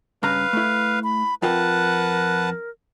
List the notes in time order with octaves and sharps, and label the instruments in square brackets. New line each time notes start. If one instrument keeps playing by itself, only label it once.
[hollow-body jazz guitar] G2 C#3 A#5 [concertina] B4 F5
[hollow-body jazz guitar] A3 E4
[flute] B5
[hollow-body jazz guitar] F2 F4 G5 [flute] A#4 [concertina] B4 F#5 A5